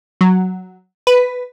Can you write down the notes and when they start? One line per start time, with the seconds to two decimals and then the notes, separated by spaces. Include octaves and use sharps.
0.21 F#3
1.07 B4